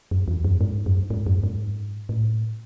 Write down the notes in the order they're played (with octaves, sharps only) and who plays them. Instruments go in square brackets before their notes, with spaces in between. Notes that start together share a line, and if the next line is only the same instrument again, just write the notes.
[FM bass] F#2
E2
F#2
G#2
F#2
G#2
F#2
G#2
A2